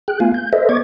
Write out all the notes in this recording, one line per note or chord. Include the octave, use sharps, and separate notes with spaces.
G#4 G5 F#6
A3 B3 F4 F5 G#5
G6
A4 B4 C5 D#5 E5
B3 D5 C#6 D6 G#6